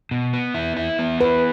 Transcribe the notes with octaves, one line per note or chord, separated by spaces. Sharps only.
B2
B3
E4
E4
B3
E4 B4